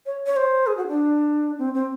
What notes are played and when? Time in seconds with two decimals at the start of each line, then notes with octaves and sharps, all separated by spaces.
0.06 C#5
0.26 C#5
0.36 C5
0.67 G#4
0.77 F#4
0.87 D4
1.59 C4
1.74 C4